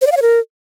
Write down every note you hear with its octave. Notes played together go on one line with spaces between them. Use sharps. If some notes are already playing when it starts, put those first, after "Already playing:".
C5
D5
F5
C#5
A#4